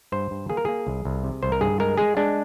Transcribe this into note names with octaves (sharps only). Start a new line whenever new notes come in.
G2 C5
G2
A#3 G#4
A#4
A#3 G#4
C2
C2
C3
C2 C5
A#4
G2 G#4
G#3 A#4
G#3 G#4
G#3 D4